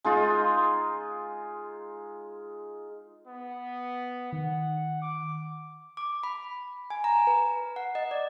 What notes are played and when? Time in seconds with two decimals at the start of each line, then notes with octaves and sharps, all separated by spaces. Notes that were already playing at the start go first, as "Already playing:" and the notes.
0.04 G#3 D#4 F4
3.27 B3
4.33 D#3 F#5
5.02 D6
5.97 D6
6.23 B5
6.90 G#5
7.04 A#5
7.27 B4
7.76 F#5
7.95 D#5
8.11 D5